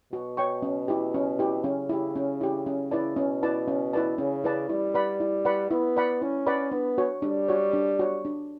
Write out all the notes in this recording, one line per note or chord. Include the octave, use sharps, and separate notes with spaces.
B2 F#4
C#5 G5 C#6
C#4
E4 G4
C#4
E4 G4
C#3 C#4
E4 G4
C#4
E4 G4
C#4
E4 B4 D5 A5
B2 C#4
E4 B4 D5 A5
C#4
E4 B4 D5 A5
C#3 C#4
E4 B4 D5 A5
G3 E4
B4 D5 F#5 B5
E4
B4 D5 F#5 B5
B3 E4
B4 D5 F#5 B5
C#4 E4
B4 D5 F#5 B5
B3 D4
F#4 C#5
G3 D4
F#4 C#5
D4
F#4 C#5
D4